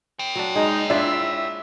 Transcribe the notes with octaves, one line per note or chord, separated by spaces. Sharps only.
C#5 G5
F#3 D4
G#3 D#4
D4 E4 F4 C5 E5